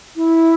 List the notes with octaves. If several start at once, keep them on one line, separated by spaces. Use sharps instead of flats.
E4